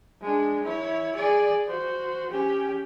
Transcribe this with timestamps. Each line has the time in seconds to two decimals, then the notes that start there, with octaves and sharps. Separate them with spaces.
0.21 G#3 D4
0.64 E4 C#5
1.16 G#4 D5
1.67 F#4 C5
2.30 C#4 G4